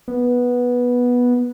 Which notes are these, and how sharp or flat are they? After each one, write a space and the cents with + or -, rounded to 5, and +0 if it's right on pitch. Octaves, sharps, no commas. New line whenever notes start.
B3 -10